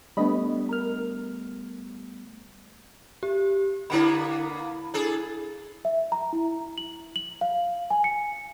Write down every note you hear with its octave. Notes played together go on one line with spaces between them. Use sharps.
G3 A3 B3 D4 D#5 B5
A#4 F6
G4
D3 A#3 B3 E4 B5
D4 G#4 A4
E5
A#5
E4
F#7
F#7
F5
G#5
C#7